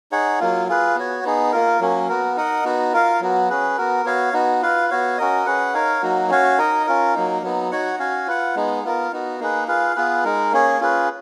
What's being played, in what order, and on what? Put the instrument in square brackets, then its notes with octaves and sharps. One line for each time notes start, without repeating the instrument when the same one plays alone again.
[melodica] D#4 G#4 C#5 F#5
F#3 A#3 F4
F4 G#4 B4
B3 F#4 C#5
B3 D#4 G#4
A#3 F4 A#4
F#3 A#3 C#4
B3 F#4 A#4
D#4 A#4 D#5 F#5
B3 D#4 F#4
F4 A#4 F5
F#3 B3 F#4
C#4 G#4 B4
B3 F#4 A#4
B3 F#4 C#5 F5
B3 D#4 F#4
F4 B4 F5
B3 F#4 C#5 F5
C#4 F#4 A#4 D#5
C#4 G#4 B4 F#5
D#4 A#4 C#5 F5
F#3 A#3 D#4 F#4
C#4 F#4 C#5 F5
D#4 A#4 D#5
C#4 F4 A#4
F#3 A#3 D#4
F#3 B3 D#4
D#4 F#4 C#5 F#5
C#4 F#4 C#5 F5
F4 B4 F#5
G#3 B3 D#4
B3 F4 A#4
B3 D#4 F#4
A#3 D#4 G#4 B4
F4 G#4 B4 F5
B3 F4 G#4 B4
G#3 D#4 A#4
A#3 C#4 G#4 C#5
C#4 F4 G#4 B4